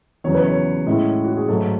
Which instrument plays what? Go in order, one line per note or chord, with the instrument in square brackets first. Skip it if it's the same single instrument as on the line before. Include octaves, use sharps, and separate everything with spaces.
[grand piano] E2 C#3 F#3 C#5
B4
C#5
A2 G#3 C#4 E4
F#4
G#4
G#2 F#3 A3 A4